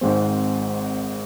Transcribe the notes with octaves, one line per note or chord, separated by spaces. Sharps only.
G#1 G#2 G#3 C4